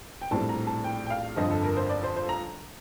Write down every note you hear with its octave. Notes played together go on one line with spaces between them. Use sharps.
G5
A#1 A2 G3 C4 A5
A#5
A5
G5
G5
F5
G1 F2 D3 F3 D#5
A4
A#4
C5
D5
C5
C5
A#5